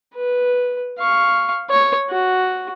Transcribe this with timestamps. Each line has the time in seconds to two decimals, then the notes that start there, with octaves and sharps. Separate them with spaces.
0.15 B4
0.99 F5 C#6
1.70 C#5
2.10 F#4